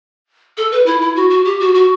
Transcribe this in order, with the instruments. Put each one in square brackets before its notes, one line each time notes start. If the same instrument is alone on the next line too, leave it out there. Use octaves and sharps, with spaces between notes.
[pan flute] A4
B4
E4
E4
F#4
F#4
G4
F#4
F#4